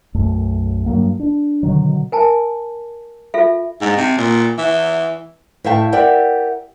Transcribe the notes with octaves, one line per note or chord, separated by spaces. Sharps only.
B1 F#2 A3
G2 F#3 A#3 B3
D4
B2 D3 D#3 F#3
A#4 G#5 A5
F4 A4 E5
G#2
C3
A#2
E3
A2 E5 F5 G5 A5
G4 A#4 D5 E5 F#5 G5